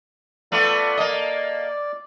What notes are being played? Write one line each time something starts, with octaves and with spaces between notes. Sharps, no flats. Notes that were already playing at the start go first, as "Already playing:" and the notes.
A3 B3 F4 D5
A#3 D#5